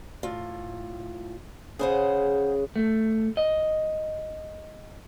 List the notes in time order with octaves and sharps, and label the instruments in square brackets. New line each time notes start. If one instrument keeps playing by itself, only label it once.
[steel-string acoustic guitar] A2 F4
[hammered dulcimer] C#3 B4 [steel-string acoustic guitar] G#4 C5 F#5
[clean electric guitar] A3
D#5